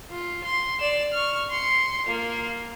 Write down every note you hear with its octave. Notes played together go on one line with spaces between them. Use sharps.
F4
C6
D5 E7
C#6 F6
C6 C#7
A#3 F4